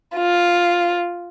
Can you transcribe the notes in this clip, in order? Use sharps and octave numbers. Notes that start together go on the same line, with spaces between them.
F4